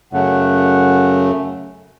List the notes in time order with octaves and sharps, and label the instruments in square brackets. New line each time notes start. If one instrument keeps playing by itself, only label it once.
[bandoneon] F#2 C#3 A3 [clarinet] F#5